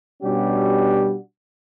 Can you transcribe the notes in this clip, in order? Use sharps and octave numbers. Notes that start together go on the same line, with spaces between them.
B2 G3 C#4 D4 F#4 G4